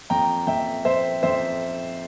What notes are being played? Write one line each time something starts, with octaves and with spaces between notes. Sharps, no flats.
F2 G5 A#5
F2 E5 G5
F2 C5 E5
F2 C5 E5